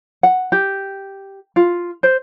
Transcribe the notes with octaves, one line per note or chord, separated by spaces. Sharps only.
F#5
G4
F4
C5